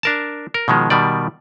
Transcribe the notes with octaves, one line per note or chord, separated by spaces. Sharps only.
D4 A#4 A5
A#4
B2 D#3 F3 G#3
B2 D#3 G3 D5